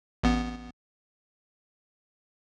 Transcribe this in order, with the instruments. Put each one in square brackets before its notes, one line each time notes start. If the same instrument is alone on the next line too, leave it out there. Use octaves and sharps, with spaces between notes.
[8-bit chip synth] A1 B3